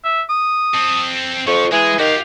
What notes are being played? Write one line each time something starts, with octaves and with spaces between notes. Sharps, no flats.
E5
D#6
C4 A4
F2 F3 C#6
E3 G#3 G#4
D#3 F#4 G4 F5